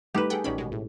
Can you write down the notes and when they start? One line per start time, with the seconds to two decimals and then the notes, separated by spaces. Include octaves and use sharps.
0.15 G3 A3 D#4 G4 B4
0.30 G#4 A4 F#5 G5 B5
0.44 A1 D#3 C#4 C#5 D5 B5
0.58 B2 G#3
0.72 A2